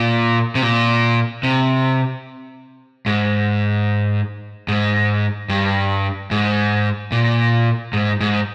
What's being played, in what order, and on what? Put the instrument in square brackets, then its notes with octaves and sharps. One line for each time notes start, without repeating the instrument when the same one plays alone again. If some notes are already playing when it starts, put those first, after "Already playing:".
Already playing: [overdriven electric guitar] A#2
C3
A#2
C3
G#2
G#2
G2
G#2
A#2
G#2
G#2